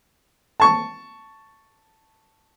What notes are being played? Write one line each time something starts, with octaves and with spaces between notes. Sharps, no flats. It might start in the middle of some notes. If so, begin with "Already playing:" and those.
A5 C#6